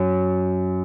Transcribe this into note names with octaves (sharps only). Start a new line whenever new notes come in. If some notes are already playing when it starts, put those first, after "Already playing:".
Already playing: F#2